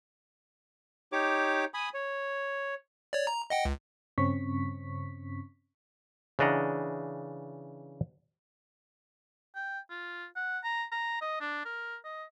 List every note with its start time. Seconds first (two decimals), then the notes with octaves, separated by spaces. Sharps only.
1.12 D#4 G4 C#5 D6
1.74 G#5 B5 D#6
1.94 C#5
3.13 C#5 D5
3.27 A#5
3.50 D#5 F#5 G5
3.65 C#2
4.18 G2 C#3 C4 C#4 C#6 B6
6.39 C#3 E3 D4 D#5 F#5 A#5
9.55 G5
9.90 F4
10.36 F#5
10.64 A#5
10.92 A#5
11.21 D#5
11.41 D4
11.65 A#4
12.05 D#5